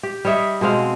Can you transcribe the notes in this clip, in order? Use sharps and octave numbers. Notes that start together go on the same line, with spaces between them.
G4
G3 C#5 D#5 E5
B2 G#3 C4 F5